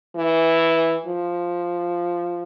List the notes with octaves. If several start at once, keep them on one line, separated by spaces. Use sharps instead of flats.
E3
F3